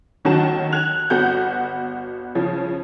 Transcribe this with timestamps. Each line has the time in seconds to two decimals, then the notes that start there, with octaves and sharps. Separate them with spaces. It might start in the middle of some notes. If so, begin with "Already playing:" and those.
0.25 D#2 D#3 F#3 F#4 A5 E7
0.72 F#6 G#6 F7
1.10 G1 B3 F#4 F#5 G6
2.35 C#3 F3